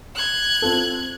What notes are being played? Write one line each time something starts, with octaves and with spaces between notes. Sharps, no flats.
F#6 G#6
C4 F4 A4